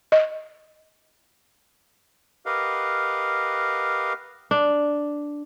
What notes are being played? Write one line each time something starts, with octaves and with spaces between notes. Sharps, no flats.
D#5
G4 A#4 B4 D#5 F5 F#5
D4